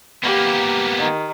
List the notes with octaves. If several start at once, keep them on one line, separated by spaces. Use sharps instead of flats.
A#3 B3 G4
D#3